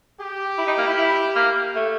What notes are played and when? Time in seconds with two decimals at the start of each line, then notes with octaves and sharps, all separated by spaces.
0.19 G4
0.58 E4
0.67 D#4
0.78 A#3
0.87 E4
0.97 E4
1.36 A#3
1.75 A3